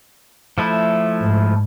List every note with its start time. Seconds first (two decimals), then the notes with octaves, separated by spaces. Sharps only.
0.58 F3 A3 E4
1.20 G#2